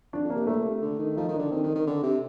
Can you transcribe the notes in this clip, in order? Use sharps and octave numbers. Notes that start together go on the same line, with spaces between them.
F2 D4
F2
A#3
C3
A#2 A3
C3
D3
D#3
F3 D#4
D#3
D4
D3
D#3 C4
D#3
D#3
D3
C3